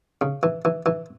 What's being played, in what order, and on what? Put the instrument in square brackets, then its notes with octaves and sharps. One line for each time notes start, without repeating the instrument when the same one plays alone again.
[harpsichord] C#3
E3
E3
E3